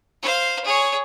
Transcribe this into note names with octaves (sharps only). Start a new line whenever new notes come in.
C5 F5
G#4 C#5